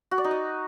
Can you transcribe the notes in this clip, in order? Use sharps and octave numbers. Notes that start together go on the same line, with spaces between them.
F#4
D5
D#4
D#5